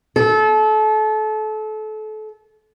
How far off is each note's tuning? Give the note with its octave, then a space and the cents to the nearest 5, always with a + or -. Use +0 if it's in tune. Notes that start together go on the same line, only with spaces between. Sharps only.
A4 -30